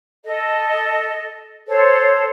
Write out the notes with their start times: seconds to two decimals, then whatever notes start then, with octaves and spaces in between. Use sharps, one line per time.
0.24 A4 D#5
1.67 A4 C5 C#5